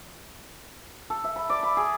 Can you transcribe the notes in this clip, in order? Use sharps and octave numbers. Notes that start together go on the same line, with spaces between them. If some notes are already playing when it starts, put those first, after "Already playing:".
A4
E5
B5
D5
B5
G#4